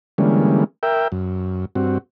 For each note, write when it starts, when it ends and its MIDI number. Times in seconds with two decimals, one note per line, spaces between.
0.18 0.64 50
0.18 0.64 52
0.18 0.64 55
0.18 0.64 56
0.18 0.64 58
0.18 0.64 61
0.83 1.08 70
0.83 1.08 76
0.83 1.08 79
1.12 1.65 42
1.75 1.98 43
1.75 1.98 60
1.75 1.98 66